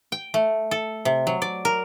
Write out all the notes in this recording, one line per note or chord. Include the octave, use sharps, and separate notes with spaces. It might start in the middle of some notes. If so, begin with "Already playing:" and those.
G5
A3
A4
C3
F#3
D5
A#4